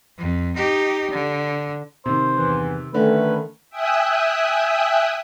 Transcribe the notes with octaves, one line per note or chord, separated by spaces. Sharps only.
F2
D#4 G4
D3
C3 D#3 C5
E2 G2 E3
D3 D#3 A3 C#4 B4
E5 G5 G#5 D#6 E6 F#6